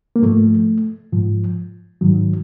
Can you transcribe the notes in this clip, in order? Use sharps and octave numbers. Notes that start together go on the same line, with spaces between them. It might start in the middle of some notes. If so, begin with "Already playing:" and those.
A#3
G#2 F3 A3
G#2 F3
G#2 D#3 F#3